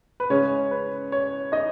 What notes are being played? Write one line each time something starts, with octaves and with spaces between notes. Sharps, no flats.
B4
C#3 G#3 C#4 C#5
B4
C#5
D#4 D#5